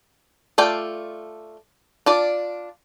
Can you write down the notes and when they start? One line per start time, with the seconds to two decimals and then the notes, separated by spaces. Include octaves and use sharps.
0.58 A3 F4 D5 G5
2.06 D4 F4 D5